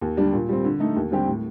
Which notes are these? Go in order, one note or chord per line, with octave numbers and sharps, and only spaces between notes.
D#2
D3 G3 D4
A#2
G3 C4
D3
A3 D#4
D#2
D3 G3 C4 G4
A2